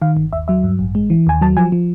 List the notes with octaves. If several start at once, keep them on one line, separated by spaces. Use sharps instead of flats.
D#3 F5
G1
D#2 E5
F#3 E5
G2
A1
G#3
E3
D#2 G#5
F#3 A5
F3 G#5
F3